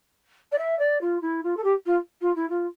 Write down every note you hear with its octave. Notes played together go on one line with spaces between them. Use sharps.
D5
E5
D5
F4
E4
F4
A4
G4
F4
F4
E4
F4